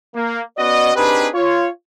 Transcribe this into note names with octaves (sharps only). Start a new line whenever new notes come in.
A#3
B3 C#4 F#4 D5 D#5
C4 D4 D#4 G4 G#4 B4
F4 C#5